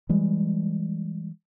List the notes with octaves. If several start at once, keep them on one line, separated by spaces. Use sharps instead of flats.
E3 G3 G#3